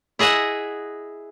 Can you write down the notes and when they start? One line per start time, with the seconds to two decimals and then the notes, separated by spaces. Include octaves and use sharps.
0.19 E4 G#4 D#5 E5 F#5